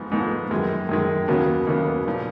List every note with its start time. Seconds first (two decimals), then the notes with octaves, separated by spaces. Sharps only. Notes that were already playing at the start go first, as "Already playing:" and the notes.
Already playing: G#2 F3 B3
0.11 G#2 F3 B3
0.51 F#2 D#3 G#3
0.89 F#2 D#3 G#3
1.28 D#2 C#3 F#3 B3
1.67 D#2 C#3 F#3 B3
2.07 A#2 F3